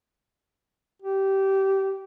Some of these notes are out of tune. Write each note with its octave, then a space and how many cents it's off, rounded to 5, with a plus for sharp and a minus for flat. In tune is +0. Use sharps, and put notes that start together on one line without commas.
G4 -20